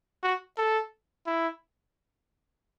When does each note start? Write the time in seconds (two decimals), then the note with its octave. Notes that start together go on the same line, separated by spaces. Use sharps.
0.23 F#4
0.58 A4
1.27 E4